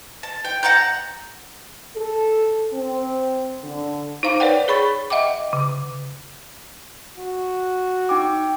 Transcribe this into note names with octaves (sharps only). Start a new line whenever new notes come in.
A5
G5
F#5 A5 A#5 G6
A4
C4
D3
D#4 C5 F5 A#5 D6
B4 C#5 D5 F#5 G5
G#4 C#5 B5 C#6 A6
D#5 E5 F#5 G5 D6
C#3
F#4
D#4 G5 D6